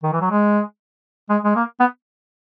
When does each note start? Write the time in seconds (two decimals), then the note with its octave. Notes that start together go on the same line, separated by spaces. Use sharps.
0.03 D#3
0.12 E3
0.21 F#3
0.30 G#3
1.29 G#3
1.44 G#3
1.55 A#3
1.80 B3